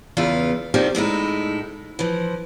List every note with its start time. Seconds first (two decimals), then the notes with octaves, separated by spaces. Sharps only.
0.17 E2 C#3 E3 F4
0.74 C3 D#3 F3 G3 C4
0.95 A2 G#3 D#4 E4
1.99 E3 F3